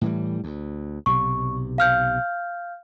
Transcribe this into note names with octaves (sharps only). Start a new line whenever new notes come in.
A2 E3 G3
D2
B1 C3 C#6
F5 F6 G6